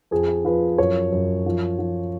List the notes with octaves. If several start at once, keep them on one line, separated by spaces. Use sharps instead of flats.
F2 G#4
F3 B4
F#2 C#5
F#2
F3
F3